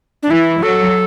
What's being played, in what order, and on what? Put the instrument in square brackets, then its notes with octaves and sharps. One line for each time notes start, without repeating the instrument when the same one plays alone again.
[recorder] D4
[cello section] E3 [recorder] E4
[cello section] F#3 [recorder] A4